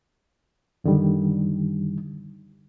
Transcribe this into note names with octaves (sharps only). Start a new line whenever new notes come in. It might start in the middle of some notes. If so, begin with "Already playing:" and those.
F#2 D3 D#3 G3